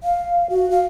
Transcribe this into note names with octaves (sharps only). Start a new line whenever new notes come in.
F5
F#4
F5